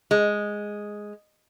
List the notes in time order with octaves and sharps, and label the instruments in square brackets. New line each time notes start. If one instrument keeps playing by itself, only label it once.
[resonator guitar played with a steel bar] G#3